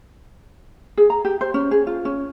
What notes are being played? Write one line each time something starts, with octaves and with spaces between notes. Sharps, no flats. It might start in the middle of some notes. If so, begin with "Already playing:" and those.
G#4
A#5
G4
C5
C#4
G#4
F4
C#4